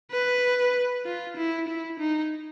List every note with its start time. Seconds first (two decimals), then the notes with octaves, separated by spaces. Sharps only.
0.12 B4
1.05 F4
1.37 E4
1.68 E4
2.00 D#4